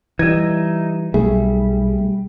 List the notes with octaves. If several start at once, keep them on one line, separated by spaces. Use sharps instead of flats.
E3 G3 D#4 D#5 E5 G#6
B1 G3 A3 G#4 E5